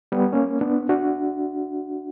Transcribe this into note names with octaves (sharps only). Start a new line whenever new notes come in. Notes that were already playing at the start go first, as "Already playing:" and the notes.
G3 B3
A#3 C#4
B3 D4
D4 F#4